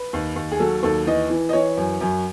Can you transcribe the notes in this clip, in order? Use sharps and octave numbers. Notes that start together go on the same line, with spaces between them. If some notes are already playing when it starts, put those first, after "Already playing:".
Already playing: B4
D#2
D#2
G#4
F#3 A4
D#2 A4
E3 D#5
E3
D#5
E3 C#5
F#2
F#2